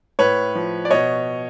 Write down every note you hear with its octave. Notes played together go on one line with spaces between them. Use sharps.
A2 B4 C#5
F3
D5
B2 C#5 D#5